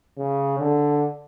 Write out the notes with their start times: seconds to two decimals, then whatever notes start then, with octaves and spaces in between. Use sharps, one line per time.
0.18 C#3
0.59 D3